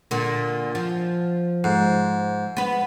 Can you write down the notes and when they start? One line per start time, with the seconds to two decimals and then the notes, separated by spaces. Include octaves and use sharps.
0.11 A#2 D3
0.75 F3
1.64 G#2
2.57 B3 B4